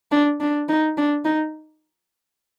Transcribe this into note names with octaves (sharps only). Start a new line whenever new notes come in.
D4
D4
D#4
D4
D#4